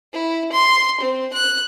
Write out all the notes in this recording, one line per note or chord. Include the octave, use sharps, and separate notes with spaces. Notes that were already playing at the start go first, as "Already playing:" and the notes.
E4
C6
C4
F#6